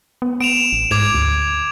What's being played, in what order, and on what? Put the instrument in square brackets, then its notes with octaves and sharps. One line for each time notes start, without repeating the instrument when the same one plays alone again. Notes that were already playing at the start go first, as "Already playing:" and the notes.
[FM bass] B3
[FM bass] B3 [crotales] D7 E7 F7
[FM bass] A1
[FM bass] G#2 [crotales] D6 G#6 F7
[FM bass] D2